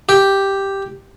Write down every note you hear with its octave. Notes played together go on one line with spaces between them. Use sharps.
G4